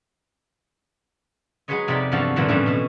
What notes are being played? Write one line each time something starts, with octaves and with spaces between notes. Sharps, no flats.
F#3 G#3 G#4 B4 C#5 D#5
F2 C3 D#4 G4 D5 B5
E2 G2 F3 F#4 A4 F5
G2 A#2 D3 E3 F3
F2 A2 D3 E3 G3 C#4
B2 C#4 E5